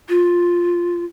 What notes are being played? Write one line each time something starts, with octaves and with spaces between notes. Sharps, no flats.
F4